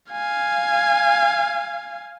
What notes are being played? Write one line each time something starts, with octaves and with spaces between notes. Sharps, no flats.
F5 G#5